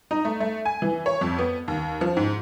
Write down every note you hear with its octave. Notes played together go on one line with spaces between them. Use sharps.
D#4
A3
A3
G#5
E3
C#5
F2
B3
D#2
F3
G#2